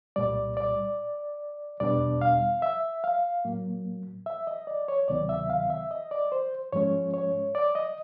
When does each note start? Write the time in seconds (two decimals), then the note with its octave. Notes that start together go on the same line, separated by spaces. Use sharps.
0.16 C2 A#2 G3 D5
0.57 D5
1.80 E2 B2 G3 B3 D4 D5
2.21 F5
2.62 E5
3.04 F5
3.45 A2 F#3 A#3
4.26 E5
4.47 D#5
4.67 D5
4.88 C#5
5.08 D2 C3 D#3 F#3 B3 D5
5.29 E5
5.50 F5
5.70 E5
5.91 D#5
6.11 D5
6.32 C5
6.73 G#2 F3 G#3 C#4 C#5
7.14 C#5
7.55 D5
7.75 D#5